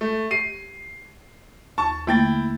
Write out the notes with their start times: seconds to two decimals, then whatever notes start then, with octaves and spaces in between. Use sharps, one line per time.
0.01 A3
0.31 G4 C7 D#7
1.78 D#2 A5 C#6
2.07 D3 A3 A#3 E4 G5 A6